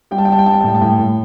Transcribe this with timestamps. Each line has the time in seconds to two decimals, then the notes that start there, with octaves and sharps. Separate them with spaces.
0.11 G3 G5
0.18 A5
0.25 G5
0.28 G3 A5
0.39 G5
0.46 G3 A5
0.53 G5
0.61 A5
0.64 A2 G5
0.75 A5
0.81 A2 G5
0.99 A2